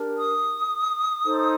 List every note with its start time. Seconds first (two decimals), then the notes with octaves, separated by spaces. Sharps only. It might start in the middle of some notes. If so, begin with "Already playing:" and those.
Already playing: D4 G4 A#4
0.19 D#6
1.24 D#4 A4 C5